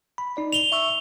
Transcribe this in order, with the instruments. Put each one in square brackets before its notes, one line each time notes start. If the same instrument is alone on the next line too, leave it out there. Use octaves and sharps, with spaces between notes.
[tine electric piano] B5
D#4 D5
[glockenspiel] F7 G7
[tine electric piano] E5 C#6 E6